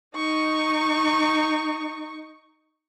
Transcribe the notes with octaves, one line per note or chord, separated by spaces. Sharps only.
D#4 C#6